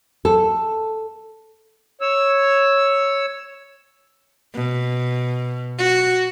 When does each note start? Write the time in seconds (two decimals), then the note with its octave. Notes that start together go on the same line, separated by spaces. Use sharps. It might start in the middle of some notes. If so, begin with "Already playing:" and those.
0.25 A4
2.01 C#5 E6
4.54 B2
5.78 F#4